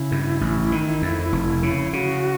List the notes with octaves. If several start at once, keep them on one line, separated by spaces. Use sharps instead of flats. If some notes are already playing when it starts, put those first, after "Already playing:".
Already playing: C#3 E4
G2
A1
D#3
F2
F1
C#3
C#3 F#4